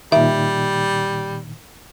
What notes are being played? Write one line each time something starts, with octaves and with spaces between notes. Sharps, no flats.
A#2 D#3 G3 E5